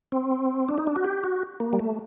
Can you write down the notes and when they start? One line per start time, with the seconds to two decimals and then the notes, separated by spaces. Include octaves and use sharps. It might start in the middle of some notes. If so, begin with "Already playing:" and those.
0.12 C4
0.69 D4
0.78 D#4
0.87 D4
0.96 F#4
1.04 G4
1.24 F#4
1.60 A#3
1.73 G3
1.79 A3